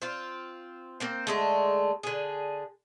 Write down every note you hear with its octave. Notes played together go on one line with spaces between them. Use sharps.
C4 F4
A#3 C4 C5
D3 G#3 A3
D3 G#4